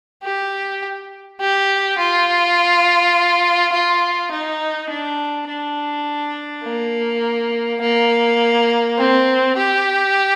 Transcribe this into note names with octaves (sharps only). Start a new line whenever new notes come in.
G4
G4
F4
F4
D#4
D4
D4
A#3
A#3
C4
G4